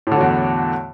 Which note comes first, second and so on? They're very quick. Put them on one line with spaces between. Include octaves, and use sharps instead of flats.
A2 D3 F#3 E2